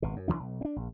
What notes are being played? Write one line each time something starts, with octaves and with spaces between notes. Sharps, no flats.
G#1 B2
F#2
B1 B2 E3 D4
B1
C4 D4
A#1